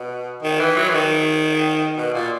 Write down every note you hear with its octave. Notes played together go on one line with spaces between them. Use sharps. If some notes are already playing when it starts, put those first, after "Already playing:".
Already playing: B2
D#3
E3
F#3
E3
D#3
B2
A#2